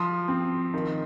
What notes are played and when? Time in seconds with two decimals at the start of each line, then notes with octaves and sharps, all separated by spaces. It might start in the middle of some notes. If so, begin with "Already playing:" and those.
Already playing: F3 C6 D#6
0.28 C4
0.74 D#3